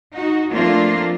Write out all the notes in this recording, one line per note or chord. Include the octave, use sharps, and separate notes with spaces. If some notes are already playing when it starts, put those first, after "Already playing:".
D#4 F#4
F3 A3 A#3 C4 D4 F4